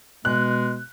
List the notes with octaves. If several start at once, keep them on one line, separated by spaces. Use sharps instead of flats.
B2 G#3 F#6